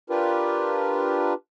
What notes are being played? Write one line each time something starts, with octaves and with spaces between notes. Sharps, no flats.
D4 F4 G4 A#4 B4